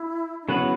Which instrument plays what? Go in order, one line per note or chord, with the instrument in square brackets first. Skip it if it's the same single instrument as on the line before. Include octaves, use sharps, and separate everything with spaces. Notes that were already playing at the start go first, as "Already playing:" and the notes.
Already playing: [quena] E4
D#4
[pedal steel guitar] C#3 F#3 B3 F#4 B4 [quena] E4